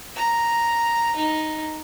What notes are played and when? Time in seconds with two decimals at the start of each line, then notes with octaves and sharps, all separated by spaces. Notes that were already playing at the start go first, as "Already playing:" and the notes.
0.16 A#5
1.16 D#4